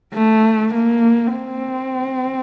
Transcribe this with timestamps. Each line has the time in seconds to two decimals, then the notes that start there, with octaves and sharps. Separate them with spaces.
0.14 A3
0.74 A#3
1.36 C4